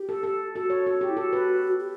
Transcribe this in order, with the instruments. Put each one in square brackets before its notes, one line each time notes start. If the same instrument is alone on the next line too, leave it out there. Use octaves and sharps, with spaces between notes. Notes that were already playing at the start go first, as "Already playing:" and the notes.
Already playing: [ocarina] G4
[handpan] A4
A4
[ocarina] F#4 [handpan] A4
[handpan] C#5
A4
G4
[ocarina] E4
[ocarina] F#4 [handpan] A4
[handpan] B4
[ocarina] G4